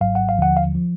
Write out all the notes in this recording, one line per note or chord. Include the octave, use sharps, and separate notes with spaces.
G#1 G#2 F#3 F5
F#5
F5
D#2 D3 F3 F#5
F5
F3